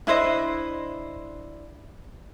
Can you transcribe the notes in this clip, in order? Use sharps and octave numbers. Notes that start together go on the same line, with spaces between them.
D4 E4 C5 D#5